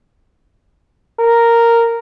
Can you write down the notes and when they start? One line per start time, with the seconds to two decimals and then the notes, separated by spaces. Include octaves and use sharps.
1.21 A#4